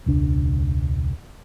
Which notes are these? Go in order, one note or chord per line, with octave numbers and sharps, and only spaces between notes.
E1 C#2 D4